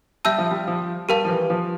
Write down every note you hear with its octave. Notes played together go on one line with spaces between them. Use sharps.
G3 E5 A5 E6 G6
F3
G3
F3
G3 G4 A#4 F5 A5
F3
E3
F3